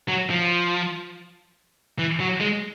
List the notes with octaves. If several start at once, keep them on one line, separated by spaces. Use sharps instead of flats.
F#3
F3
E3
F#3
G#3